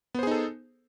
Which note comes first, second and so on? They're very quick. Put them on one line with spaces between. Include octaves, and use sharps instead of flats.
B3 C5 G#4 D#4 A4